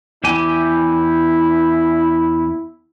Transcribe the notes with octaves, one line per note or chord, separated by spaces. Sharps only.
E2 E4 G4 G#5